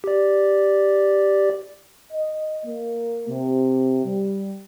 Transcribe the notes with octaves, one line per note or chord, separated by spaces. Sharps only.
G4 D5
D#5
A#3
C3
G3